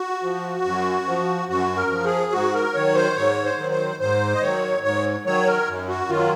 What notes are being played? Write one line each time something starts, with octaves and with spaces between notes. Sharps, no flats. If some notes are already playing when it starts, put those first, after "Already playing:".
Already playing: F#4
F3
F#2
F3
F#2 F#4
A#4
F3
G#4
G#2 F#4
A#4
D#3 F#3 C#5
C5
G#2 C#5
C5
D#3 F#3
C5
G#2 C5
D#5
D#3 F#3 C#5
G#2 C#5
D#3 F#3 C#5
A#4
F#2
F#4
D#3 F#3 F4